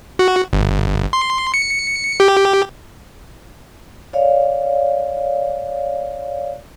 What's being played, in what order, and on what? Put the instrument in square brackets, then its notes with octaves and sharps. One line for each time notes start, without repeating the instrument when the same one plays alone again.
[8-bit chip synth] F#4
G1
C6
C#7
G4
[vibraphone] C#5 D5 F5